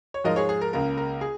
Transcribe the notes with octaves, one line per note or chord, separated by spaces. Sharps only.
C#5
G#2 F3 G#3 A#4 D#5
G#4 C#5
G#4
A#4
C#2 C#3 A#3 A#4
A#4
G#4